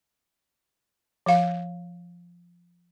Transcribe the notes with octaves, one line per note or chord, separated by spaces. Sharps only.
F3 F5